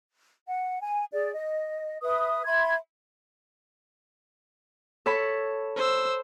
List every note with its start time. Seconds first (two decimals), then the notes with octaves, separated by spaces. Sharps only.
0.46 F#5
0.80 G#5
1.12 G#4 D5
1.33 D#5
2.02 B4 E5 D#6
2.46 E5 B5 C6 G#6
5.06 A4 C#5 B5
5.76 C5 E6